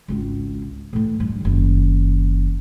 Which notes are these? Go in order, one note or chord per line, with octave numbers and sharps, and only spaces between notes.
G#1 C#2
A2 E3
G2
F#1 D#3